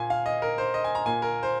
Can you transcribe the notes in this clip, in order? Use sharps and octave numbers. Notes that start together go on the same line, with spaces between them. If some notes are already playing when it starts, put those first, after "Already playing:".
Already playing: A#2 A#3 G#5
F5
D#5
A#4
C5
D#5
G#5
A#5
A#2 A#3 G#5
A#4
C5